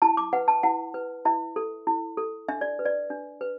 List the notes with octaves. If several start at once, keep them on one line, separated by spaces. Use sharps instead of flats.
E4 A5
D6
B4 F#5
A5
E4 F#5
B4
E4 E5
A4
E4
A4
D4 E5
D5
B4
D5
D4
B4